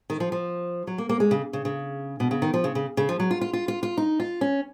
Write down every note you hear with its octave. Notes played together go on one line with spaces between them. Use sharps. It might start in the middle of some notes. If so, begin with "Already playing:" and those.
D#3
F3
F3
F#3
A#3
A#3
G#3
C#3
C#3
C#3
B2
C#3
D#3
F3
C#3
C#3
C#3
F3
F#3
F4
F4
F4
F4
F4
D#4
F4
C#4